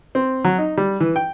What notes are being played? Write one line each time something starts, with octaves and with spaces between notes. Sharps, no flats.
C4
F#3
D#4
G3
E3
G5